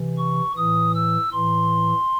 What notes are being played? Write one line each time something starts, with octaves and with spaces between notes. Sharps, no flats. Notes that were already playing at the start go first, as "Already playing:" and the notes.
Already playing: C3 E3
C#6
A2 E3 D#6
E6
A2 E3 C6